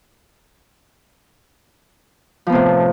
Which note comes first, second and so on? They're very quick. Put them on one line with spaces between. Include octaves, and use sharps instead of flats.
F3 B3 C3 A2